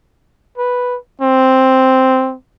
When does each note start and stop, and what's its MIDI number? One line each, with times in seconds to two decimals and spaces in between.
0.58 0.97 71
1.21 2.35 60